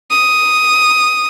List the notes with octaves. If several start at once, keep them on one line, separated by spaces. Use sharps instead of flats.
D#6